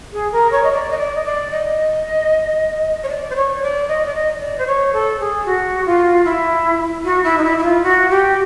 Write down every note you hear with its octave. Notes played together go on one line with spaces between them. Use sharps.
G#4
A#4
C#5
D#5
D5
D#5
D5
D#5
D5
D#5
C#5
D5
C5
C#5
D5
D#5
D5
D#5
D5
C5
C#5
A4
G#4
F#4
F4
E4
F#4
E4
D#4
E4
E4
F4
F#4
G4